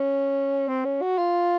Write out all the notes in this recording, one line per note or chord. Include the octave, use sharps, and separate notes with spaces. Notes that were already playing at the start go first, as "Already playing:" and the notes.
Already playing: C#4
C4
C#4
F#4
F4